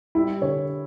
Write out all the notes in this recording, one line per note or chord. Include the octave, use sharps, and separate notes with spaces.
G3 E4
D3 C#5